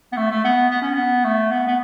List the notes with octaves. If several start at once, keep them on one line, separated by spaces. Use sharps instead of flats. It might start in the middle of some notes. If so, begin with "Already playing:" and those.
B3
A3
A3
B3
B3
C#4
B3
A3
B3
B3